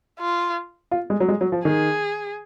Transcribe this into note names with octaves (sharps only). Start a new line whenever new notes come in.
F4
F4
G#3
F#3
G#3
F#3
F3
D#3 G#4